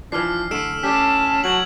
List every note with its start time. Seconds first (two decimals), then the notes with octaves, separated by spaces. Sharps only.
0.12 E3 F3 D4 F6 C7
0.51 D3 A3 E6 D7 E7
0.83 C#4 G4 D5 A5 B6
1.44 F#3 G#6 F#7